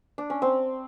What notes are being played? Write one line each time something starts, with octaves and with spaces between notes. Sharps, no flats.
D4
C#4
C4